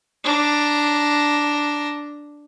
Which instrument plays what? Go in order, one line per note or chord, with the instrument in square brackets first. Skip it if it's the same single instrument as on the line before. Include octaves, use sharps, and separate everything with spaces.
[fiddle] D4 A#5